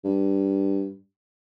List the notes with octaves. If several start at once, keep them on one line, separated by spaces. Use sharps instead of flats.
G2